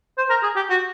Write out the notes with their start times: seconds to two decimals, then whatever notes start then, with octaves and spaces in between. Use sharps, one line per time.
0.18 C5
0.30 A#4
0.43 G#4
0.56 G4
0.70 F#4